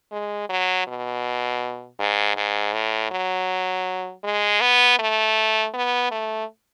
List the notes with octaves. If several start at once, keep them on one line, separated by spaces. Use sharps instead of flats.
G#3
F#3
B2
G#2
G#2
A2
F#3
G#3
B3
A3
B3
A3